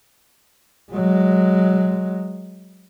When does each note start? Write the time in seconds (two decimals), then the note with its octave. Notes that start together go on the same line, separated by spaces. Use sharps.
0.93 F#3 G#3